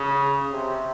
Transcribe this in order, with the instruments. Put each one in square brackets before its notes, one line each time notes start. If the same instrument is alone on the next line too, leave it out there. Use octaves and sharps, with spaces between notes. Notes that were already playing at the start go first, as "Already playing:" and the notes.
Already playing: [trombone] C#3
C3